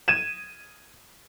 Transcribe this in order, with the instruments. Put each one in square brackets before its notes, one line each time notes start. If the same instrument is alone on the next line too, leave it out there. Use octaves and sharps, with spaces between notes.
[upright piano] G#6 D#7 E7